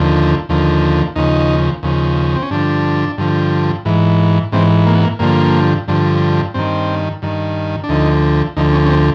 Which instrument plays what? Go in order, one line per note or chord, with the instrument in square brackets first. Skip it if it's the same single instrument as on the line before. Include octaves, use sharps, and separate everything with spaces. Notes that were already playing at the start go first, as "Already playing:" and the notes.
Already playing: [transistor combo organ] D#2 D3 F3
D#2 D3 F3
D#2 C#3 F3 D#4
D#2 C#3 F3
C4
C#4
G2 D3 F3 D4
G2 D3 F3
G#2 E3
G#2 E3 C4
A#3
B3
A#3
G2 D3 F3 A#3
G2 D3 F3
G2 D#3 C4
G2 D#3
D4
D2 D3 F3 D#4
D2 D3 F3 D#4
C#4
C#4
C4